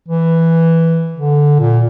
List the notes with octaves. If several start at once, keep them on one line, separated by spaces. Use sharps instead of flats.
E3
D3
A#2